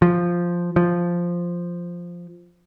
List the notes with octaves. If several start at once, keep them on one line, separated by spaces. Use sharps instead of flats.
F3
F3